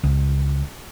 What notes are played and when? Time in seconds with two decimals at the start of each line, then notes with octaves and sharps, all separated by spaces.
0.03 C#2